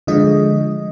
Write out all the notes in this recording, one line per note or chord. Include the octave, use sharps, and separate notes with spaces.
D3 F3 G#3 D#5